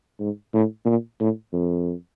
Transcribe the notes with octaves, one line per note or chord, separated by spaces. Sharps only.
G#2
A2
A#2
A2
F2